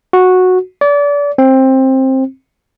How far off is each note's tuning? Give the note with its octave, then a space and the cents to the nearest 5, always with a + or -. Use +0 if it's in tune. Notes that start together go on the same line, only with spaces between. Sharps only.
F#4 -10
D5 -30
C4 +15